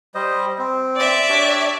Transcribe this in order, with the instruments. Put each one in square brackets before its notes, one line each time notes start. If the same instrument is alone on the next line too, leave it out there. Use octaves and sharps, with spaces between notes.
[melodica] G3 C5 D#5
C4
[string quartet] D5 E5
[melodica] D4 G4 C#5